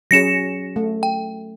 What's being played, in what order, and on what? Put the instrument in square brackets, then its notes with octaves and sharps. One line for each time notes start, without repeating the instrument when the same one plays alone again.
[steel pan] F#3 C#4 G#4 [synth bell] A#6 C#7 E7
[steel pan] A3
[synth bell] G5